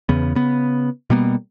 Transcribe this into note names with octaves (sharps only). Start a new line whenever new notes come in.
E2 C#3 B3
C#3 B3
B2 G3 A#3 B3